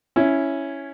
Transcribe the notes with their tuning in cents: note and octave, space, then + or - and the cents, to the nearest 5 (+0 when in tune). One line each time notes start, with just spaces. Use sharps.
C#4 +0 E4 +0